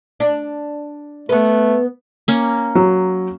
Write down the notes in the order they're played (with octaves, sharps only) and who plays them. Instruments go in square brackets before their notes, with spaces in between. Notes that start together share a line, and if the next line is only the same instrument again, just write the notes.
[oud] D4
[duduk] A3 [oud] B3 B4
[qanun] A#3 C#4
[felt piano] F#3